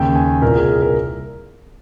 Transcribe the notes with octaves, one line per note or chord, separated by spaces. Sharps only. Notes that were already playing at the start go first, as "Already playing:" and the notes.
Already playing: D#2 C#3 G5
G#5
C2 A#2 A#4
G#4
G#4
A#4